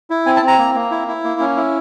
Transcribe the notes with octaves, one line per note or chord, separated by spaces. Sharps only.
E4
C4 G#5
A5
C4
A#5
A#3
A#3
E4
E4
A#3
C#4
E4